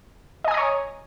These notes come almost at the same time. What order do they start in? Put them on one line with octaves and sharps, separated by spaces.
D#5 G#5 D#6 A#5 C#5